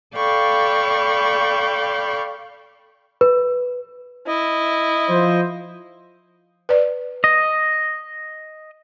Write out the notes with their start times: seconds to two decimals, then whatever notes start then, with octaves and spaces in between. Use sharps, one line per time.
0.14 A4 D5 F5 G5 B5 C#6
3.21 B4
4.27 E4 D#5
5.08 F3 C5
6.69 B4 D5
7.24 D#5